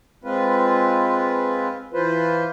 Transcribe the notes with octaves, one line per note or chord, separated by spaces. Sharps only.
G#3 C4 F4 B4
E3 F4 B4 C5